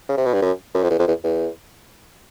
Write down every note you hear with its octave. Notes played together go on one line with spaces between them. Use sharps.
C#3
C3
B2
G2
F#2
F#2
F2
E2
F2
E2
E2